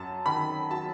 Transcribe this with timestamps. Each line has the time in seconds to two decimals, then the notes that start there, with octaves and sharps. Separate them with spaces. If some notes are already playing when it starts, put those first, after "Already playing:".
Already playing: F#2 A5
0.26 D#3 B5
0.71 F#3 A5